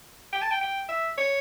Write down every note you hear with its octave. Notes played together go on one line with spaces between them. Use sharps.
G5
A5
G5
G5
E5
C#5